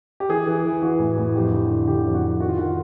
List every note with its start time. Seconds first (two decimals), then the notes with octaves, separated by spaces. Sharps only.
0.20 G4
0.29 E3 G#4
0.47 E3
0.65 E3
0.82 E3 F#4
0.99 A2
1.18 A2
1.35 F2 G4
1.52 D3
1.70 D3
1.87 D3 G4
2.05 F2
2.14 F#4
2.24 F2
2.40 D#3 F#4
2.49 F4
2.58 D#3 F#4